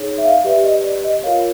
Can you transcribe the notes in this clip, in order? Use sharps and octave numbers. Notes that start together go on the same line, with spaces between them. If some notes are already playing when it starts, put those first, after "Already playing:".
Already playing: D#4 G#4 C#5
E5
F5
G4 B4 D5 E5
D#5
D5
D#5
F4 A#4 C#5 F5